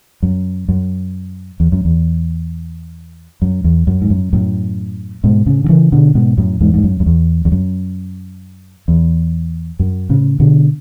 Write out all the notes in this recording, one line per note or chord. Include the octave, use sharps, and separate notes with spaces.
F#2
F#2
E2
F#2
E2
F#2
E2
F#2
G#2
F#2
F#2 A2
G#2 B2
A2 C#3
D3
C#3 E3
B2 D3
G#2 B2
F#2 A2
E2 G#2
G#2
F#2
F#2
E2
E2
F#2
E2
F#2
A2 C#3
B2 D3